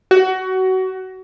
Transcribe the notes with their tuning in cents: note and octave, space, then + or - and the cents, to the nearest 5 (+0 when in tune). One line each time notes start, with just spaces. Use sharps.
F#4 +25